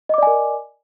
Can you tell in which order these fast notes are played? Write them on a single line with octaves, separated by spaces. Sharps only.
D#5 D6 D5 G#5 A#4